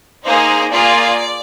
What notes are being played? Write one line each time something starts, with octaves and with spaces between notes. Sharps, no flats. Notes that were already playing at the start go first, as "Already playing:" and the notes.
A#3 D#4 G#4 C5
A#3 F4 G#4 D5